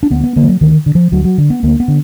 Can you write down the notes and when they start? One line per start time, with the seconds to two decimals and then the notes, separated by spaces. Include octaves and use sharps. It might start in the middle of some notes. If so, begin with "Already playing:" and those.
0.03 D4
0.11 D2 B3
0.24 B3
0.36 D3 A#3
0.43 F3
0.48 F#3
0.61 D2 D#3
0.86 D3
0.95 F3
1.12 D2 F#3
1.25 F#3
1.38 D3
1.50 B3
1.63 D2 A#3
1.80 B3
1.88 D3